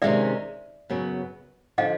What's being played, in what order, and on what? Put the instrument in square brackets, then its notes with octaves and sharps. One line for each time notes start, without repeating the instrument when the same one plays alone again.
[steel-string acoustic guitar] C3 D#3 G#3 C#4 [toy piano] D5 E5
[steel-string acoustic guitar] F#2 C#3 F#3 B3
[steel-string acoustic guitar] D3 F3 [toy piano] D#5 F5